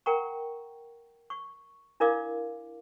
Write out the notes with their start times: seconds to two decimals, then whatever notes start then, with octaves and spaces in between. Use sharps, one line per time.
0.06 A#4 F#5 G5 A#5 C#6
1.30 C#6
2.00 D4 E4 A#4 D5 F5 D6